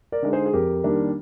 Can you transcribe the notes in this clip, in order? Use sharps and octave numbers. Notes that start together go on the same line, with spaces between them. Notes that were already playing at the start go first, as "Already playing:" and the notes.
A#4 D5
D3 G#3 D#4
G#4 C5
G#4
F2 G4 A#4
D#3 G3 A#3 D4